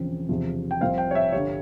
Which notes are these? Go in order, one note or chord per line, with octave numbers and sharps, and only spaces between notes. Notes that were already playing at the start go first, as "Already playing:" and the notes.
Already playing: E1 E2 C#3 F3 C4
E1 E2 C3 F3
G5
C2 C3 F3 C4 F5
G5
C#5
E5
G1 G2 G3 C#5